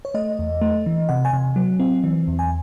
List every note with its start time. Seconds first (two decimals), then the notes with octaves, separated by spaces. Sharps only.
0.05 C#5
0.14 A3 D#5
0.39 E2
0.61 A3
0.86 E3
1.09 C3 F#5
1.25 G#5
1.33 C3
1.56 F#3
1.80 C4
2.04 E3
2.28 E2
2.39 G#5